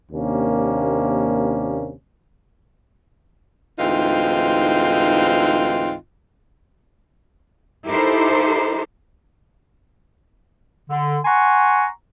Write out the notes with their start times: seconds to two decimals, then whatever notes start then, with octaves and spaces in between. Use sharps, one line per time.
0.12 D#2 C3 A#3 C#4 D4
3.79 D2 G#2 E3 C4 D#4 F4
7.86 D#4 E4 G4 A4 A#4 C5
10.90 D3
11.25 F#5 G#5 A#5 C6 C#6